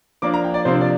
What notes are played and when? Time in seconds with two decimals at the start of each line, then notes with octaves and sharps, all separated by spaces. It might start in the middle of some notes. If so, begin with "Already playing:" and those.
0.22 F3 A#3 D4 D6
0.34 A#5
0.44 G5
0.54 D5
0.65 C3 F3 A#3 D4 C5
0.81 D5